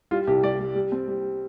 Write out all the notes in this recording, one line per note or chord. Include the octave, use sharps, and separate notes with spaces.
G3 F4
C2 G4
G3 D5
G3
G3
C4
G3